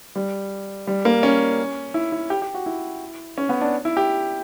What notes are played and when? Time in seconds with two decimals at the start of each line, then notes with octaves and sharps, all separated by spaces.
0.16 G3
0.87 G3
1.05 A#3
1.23 C#4
1.94 E4
2.12 E4
2.30 G4
2.42 G4
2.54 F#4
2.66 E4
3.38 C#4
3.49 B3
3.61 D4
3.85 E4
3.97 G4